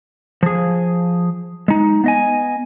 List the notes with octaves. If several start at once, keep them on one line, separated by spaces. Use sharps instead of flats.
F3 G#4
G#3 D#4
B3 D#5 G#5